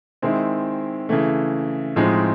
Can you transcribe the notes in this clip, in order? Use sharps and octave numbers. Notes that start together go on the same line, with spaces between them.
D#3 G#3 C4 E4
C#3 E3 A3
A2 F3 G#3 C4 D#4